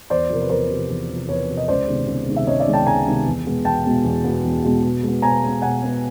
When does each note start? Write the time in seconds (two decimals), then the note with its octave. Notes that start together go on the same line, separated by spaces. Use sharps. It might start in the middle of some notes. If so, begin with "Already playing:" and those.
0.10 E2 C5 D5
0.30 C3 F3 A#4
0.42 B4
0.50 E2 A#4 C5
0.70 C3 F3
0.89 E2
1.09 C3 F3
1.28 E2 B4 C#5
1.48 C3 F3
1.57 D#5
1.68 C#2 C5 D5
1.87 C3 D#3 G#3 B3
2.07 C#2
2.27 C3 D#3 G#3 B3
2.36 E5
2.47 C#2 C#5 D#5
2.60 D5 E5
2.66 C3 D#3 G#3 B3
2.73 G5 A5
2.86 C#2 G#5 A#5
3.06 C3 D#3 G#3 B3
3.26 E2
3.45 B2 G#3 B3
3.65 E2 G5 A5
3.85 B2 G#3 B3
4.04 E2
4.24 B2 G#3 B3
4.44 E2
4.64 B2 G#3 B3
4.83 B2
5.03 G#3
5.08 B3
5.22 B2 G#5 A#5
5.43 G#3 B3
5.62 B2 F#5 G#5
5.82 G#3 B3